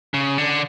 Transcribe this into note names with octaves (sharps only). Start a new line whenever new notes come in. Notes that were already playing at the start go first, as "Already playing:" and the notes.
C#3
D3